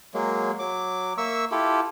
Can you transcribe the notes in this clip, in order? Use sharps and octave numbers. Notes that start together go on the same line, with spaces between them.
F#3 G#3 A#3
F#3 D6
A#3 E5 C#6 E6
E4 F4 G4 A4